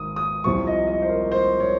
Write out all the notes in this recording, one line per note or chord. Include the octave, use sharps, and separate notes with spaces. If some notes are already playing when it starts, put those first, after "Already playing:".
Already playing: G#1 D#3 D#6
D#6
C2 C3 F3 C#6
D#5
D#5
C5
A#4
C5
C#5